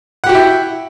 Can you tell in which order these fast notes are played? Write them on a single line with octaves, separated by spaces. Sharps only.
F#5 G4 F#4 G5 E4